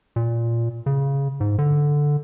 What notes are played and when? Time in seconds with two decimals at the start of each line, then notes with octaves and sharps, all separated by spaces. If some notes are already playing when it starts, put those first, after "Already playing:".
0.16 A#2
0.86 C#3
1.40 G#2
1.59 D3